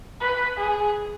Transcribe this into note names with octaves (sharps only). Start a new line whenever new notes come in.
B4
G#4